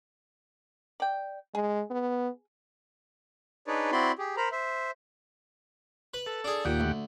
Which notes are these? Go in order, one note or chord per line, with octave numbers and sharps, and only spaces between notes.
D5 G5
G#3 G#4
B3
D4 D#4 G#4 B4 C#5 D5
C4 E4 F#4 D5 B5 C6
G4 G#4
A#4 C5 A#5 B5
C5 E5
B4
A4
D4 G#4
D#2 A#2 G4 F#5
D2